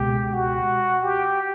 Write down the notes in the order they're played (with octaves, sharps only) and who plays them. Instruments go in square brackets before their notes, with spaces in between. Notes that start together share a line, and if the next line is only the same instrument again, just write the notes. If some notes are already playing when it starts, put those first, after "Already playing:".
Already playing: [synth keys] C#2 B2 G#3 [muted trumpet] G4
[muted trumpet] F#4
G4